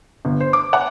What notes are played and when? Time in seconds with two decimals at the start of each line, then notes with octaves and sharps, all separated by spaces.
0.25 G1
0.40 C5
0.53 D6
0.73 F#5